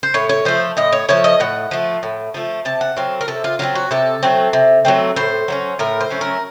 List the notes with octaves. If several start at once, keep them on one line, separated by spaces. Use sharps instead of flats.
C5
A2 C#5
C#5
F3 A3 C5
A2 D#5
C#5
F3 A3 C#5
D#5
A2 F#5
F3 A3
A2
F3 A3
C3 A5
F#5
F#3 A3 C4 F5
A#4
C3 A4
F4
F#3 A3 C4 F4
F#4
C3 A4
F#3 A3 C4
C3
F#3 A3 C4
A2 C5
F#3 A3 C#4
A2 A#4
C5
F#3 A3 C#4
A#4